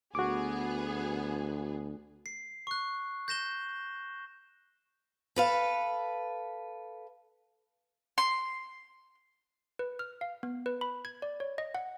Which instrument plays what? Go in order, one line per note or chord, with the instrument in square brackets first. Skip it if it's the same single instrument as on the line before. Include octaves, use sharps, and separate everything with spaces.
[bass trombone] D2 [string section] B3 G#4 [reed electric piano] F#4 D6
[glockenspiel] C7
C#6 F#6
G6 A#6 E7 G7
[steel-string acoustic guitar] A4 B4 F5
[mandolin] C6
[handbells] B4
F6
F5
B3
B4
B5
G#6
D5
C#5
D#5
F#5